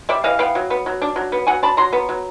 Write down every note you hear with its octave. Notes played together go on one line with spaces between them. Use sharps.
G3 D5 E5
E3 D#5 F5
B3 F5 G5
F#3
B3
F#3
D4
F#3
B3
F#3 F#5 G#5
D4 A5 B5
F#3 A#5 C6
B3
F#3